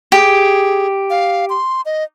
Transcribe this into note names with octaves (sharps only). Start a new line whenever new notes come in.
G4 G#4
F5
C6
D#5